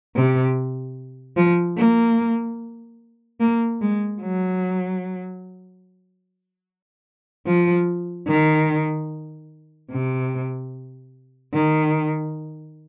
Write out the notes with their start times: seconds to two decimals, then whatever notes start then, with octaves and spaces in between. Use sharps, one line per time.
0.16 C3
1.37 F3
1.77 A#3
3.40 A#3
3.81 G#3
4.21 F#3
7.47 F3
8.28 D#3
9.91 C3
11.54 D#3